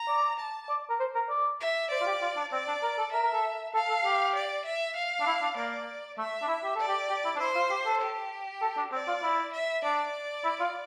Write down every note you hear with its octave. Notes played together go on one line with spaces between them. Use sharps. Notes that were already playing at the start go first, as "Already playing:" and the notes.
Already playing: A#5
D5
A5
D5
A#4
C5
A#4
D5
E5
C5 D5
F4
G4
F4
D4
C4 D5
D4
A#4
A4
A#4 E5
A#4
A4
A4 F5
A4
G4
D5
E5
F5
D4
E4
D4
A#3 D5
A3 E5
D4
E4
G4
A4 D5
G4
G4
E4
D4
E4 C5
F4
G4
A4
G4
A4
D4
C4 D5
F4
E4
E5
D4 D5
E4
F4